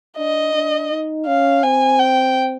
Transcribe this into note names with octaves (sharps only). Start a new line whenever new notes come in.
D4 D#5
D4
D#4
C#4 F5
C4 G#5
G5